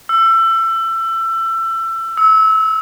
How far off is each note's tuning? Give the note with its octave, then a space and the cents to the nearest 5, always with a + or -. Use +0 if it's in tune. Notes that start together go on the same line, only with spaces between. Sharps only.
E6 +25
E6 -25